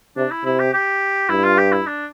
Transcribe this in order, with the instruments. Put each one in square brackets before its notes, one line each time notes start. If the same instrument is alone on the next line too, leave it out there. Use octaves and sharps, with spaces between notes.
[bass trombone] C3 [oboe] D4
[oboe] E4
[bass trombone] C3 [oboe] E4
[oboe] G4
G4
[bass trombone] G2 [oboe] E4
[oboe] F4
G4
E4
D4